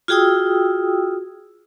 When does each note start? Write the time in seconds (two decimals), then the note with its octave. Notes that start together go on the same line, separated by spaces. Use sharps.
0.08 F4 F#4 G#4 G5 D#6 E6